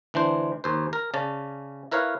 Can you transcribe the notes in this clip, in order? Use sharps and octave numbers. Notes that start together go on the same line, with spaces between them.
D2 E3 D4 C5
D#2 C5
A#4
C#3 C#4 D5 A5
E4 A#4 B4 C#5 F5